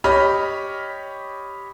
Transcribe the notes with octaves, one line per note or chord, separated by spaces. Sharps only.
G4 C#5 D#5 B5 F6